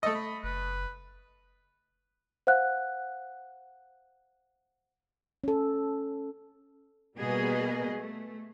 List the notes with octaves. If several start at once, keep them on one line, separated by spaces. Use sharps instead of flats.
A3 A4 D#5
B5
F#1 B4
C5 F5 F#5 F#6
C#4 A4
B2 G3 A#3 B3 G#4 D#5
A3